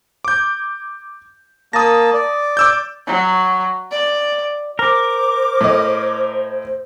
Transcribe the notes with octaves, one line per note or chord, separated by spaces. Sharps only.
D6 G6
A#3 A5 D#6 A#6
D5
D6 E6 G6
F#3
D5
A#4 C5 D6
A2 D#5